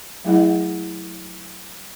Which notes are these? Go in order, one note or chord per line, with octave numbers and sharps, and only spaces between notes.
F#3 A3 E4 G#4 D#5 F#5